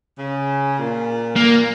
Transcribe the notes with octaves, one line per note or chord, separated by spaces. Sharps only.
C#3
A#2
A#3